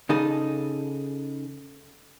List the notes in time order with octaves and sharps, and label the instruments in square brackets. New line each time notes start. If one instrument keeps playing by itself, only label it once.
[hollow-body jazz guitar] C#3 D#4 G#4 A4